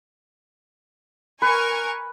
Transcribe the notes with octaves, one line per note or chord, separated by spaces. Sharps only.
A#4 B4 G#5 C#6